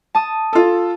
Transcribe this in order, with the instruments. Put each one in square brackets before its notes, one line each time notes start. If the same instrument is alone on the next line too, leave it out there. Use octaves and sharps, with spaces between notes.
[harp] A5 D#6
[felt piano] F4 A4